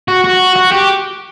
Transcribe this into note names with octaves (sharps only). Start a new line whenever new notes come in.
F#4
F#4
F#4
G4